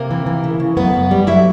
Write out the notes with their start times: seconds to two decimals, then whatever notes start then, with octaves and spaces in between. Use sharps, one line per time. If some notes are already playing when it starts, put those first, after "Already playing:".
Already playing: C3 A#3 A#4
0.11 E3
0.26 E3
0.44 C#3
0.60 C#3
0.77 F#2 B3 B4
0.94 F#2
1.11 G3
1.27 F#3 E4 E5